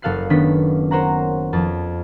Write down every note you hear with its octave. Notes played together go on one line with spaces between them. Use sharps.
F#1 A4 F5 F#6 C7
D#3 B3 C#4 D4 A4 B6
A#4 C5 C#5 F#5 A#5
F2 A5